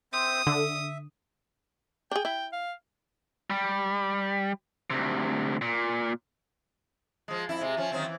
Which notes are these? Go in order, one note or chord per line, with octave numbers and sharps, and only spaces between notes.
C4 C5 E5 D#6
D3 E5
D4 G#4 G5
E4 G5
F5
G3
D2 C3
A#2
F3 G#3
F2 E4
C3 G#3
F3 C#4
D#3 F#3 C4
E3